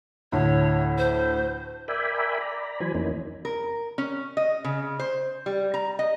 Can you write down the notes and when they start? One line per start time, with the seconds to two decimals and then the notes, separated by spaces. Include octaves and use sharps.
0.32 D2 A2 C#5
0.98 C5
1.88 A#4 D5 E5 G5 G#5 B5
2.41 D5 A#5 B5
2.80 E3 F#3 C5 G#5 B5
2.94 F2 E3 A#3 C#4 D#4
3.45 A#4
3.98 C#4
4.37 D#5
4.64 C#3
4.99 C5
5.46 G3
5.74 A#5
5.99 D#5